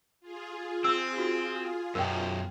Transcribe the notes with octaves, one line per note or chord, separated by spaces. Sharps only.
F4 G#4
C4 E6
F#4
F#2 B2 A#4 G5